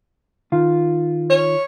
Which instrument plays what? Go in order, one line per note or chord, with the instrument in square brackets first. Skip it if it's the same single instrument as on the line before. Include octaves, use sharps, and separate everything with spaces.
[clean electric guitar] D#3 F4
[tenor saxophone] C#5